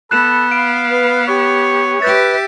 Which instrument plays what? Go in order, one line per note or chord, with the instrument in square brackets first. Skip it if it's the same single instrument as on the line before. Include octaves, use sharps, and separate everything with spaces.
[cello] B3 [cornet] A4 [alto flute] B5 [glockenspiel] F#6 E7
[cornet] F5 [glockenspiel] D7
[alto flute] B4
[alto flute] G4 [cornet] C#5
[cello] G4 E5 [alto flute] B4 [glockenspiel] G6 A6